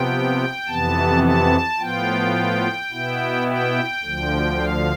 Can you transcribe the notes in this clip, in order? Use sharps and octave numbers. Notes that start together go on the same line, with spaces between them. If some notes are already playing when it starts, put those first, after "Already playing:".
Already playing: C3 F3 B3 G5
F2 C3 E3 B3 A5
A5
A2 F3 B3 F4 G5
B2 B3 E4
G5
D2 D3 F3
F5